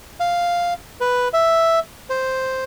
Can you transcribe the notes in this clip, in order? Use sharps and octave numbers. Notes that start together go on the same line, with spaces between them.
F5
B4
E5
C5